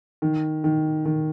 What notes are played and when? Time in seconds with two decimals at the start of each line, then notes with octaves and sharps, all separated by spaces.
0.22 D#3
0.64 D#3
1.05 D#3